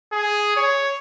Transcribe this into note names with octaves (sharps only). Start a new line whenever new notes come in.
G#4
C#5